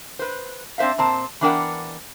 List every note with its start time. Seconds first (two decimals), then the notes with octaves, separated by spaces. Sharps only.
0.19 B4 C5
0.78 C4 D4 C5 E5 F5
0.98 A#2 C4 A5
1.41 E3 B3 D4 A#4 F#5 G5